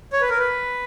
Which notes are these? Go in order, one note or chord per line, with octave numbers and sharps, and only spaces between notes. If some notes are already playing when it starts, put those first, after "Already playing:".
C#5
B4
A#4
B4